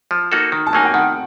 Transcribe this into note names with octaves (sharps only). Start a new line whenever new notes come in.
F3
A#3 D#4 F#4 A4
D#3
A5
F#3 A#3 D#4 G#5
G5
D#3 F#5